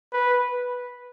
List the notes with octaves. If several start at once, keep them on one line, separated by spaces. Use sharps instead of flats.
B4